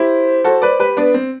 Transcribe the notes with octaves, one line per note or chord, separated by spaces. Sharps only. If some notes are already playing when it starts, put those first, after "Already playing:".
Already playing: E4 G4 C5
F#4 A4
B4 D5
G4 B4
B3 D4 B4
C4